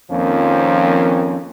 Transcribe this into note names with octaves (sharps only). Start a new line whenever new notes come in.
F2 D#3 F3 A#3 C4 C#4